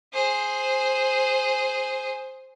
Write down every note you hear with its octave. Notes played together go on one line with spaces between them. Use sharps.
G#4 C5